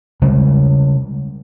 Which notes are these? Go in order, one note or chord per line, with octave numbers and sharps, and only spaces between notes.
C#3 G3 G#3